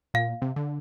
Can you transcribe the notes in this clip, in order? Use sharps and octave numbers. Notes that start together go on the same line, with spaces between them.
A#2 F5
C3
D3